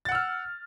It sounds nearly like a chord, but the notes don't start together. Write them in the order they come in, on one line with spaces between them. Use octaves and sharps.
A6 F#5 E6 F6